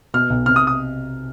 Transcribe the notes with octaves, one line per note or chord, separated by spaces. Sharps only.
B2 F6
B1
C3 F6
D#6
D#6